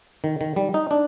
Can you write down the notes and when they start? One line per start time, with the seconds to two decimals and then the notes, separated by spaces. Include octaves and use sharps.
0.24 D#3
0.41 D#3
0.56 G3
0.74 D#4
0.91 D4